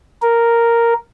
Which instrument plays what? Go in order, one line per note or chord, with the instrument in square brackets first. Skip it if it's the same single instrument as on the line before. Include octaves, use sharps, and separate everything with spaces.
[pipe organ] A#4